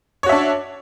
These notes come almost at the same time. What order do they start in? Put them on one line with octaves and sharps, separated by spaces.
C#5 F#4 E5 D4